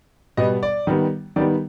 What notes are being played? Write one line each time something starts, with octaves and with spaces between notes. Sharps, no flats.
B2 G3 B3 D#5
D5
D#3 G3 B3
D#3 G3 B3 D5